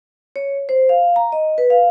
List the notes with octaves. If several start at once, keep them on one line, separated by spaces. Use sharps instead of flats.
C#5
C5
F5
A#5
D#5
B4
F5